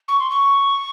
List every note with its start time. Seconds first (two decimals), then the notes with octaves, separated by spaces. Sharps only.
0.08 C#6
0.20 C6
0.30 C#6